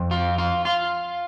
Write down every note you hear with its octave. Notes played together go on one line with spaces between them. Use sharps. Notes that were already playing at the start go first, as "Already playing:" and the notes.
Already playing: F2
F4
F4
F4